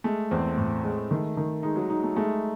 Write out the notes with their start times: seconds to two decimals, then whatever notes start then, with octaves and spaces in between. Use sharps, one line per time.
0.04 G#3 A3
0.31 E2 C4
0.58 A2
0.84 G#3
1.11 D#3 A3
1.37 D#3
1.63 G#3 D#4
1.76 F#3
1.90 D#4
2.03 A3
2.16 G#3 A3